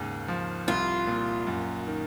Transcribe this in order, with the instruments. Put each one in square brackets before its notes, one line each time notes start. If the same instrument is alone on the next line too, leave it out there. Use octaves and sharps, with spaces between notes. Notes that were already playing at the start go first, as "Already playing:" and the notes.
Already playing: [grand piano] D#2 G#2 C#3
F3
[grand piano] C2 [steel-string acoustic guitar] F4
[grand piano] A#2
F#2
D#3